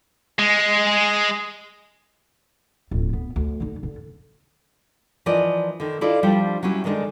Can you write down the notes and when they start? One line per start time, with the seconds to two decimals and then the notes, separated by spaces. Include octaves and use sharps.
0.39 G#3
2.91 D1 F2
3.13 B3
3.36 D2
3.60 D3 D#4
3.83 D3
5.26 E3 F3 A#4 D5 D#5
5.80 D3 D#3
6.01 E4 F4 A4 D5 D#5 F5
6.23 F3 G3 D4 E4 F4 G4
6.63 F#3 G3 C#4 E4
6.84 D3 D#3 G#3 D4 D#4